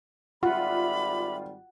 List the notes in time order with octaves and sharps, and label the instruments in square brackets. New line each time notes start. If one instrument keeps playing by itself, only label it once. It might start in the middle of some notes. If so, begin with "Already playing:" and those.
[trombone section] G#1 G3 [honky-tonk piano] F4 [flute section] E5 B5 [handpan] F#5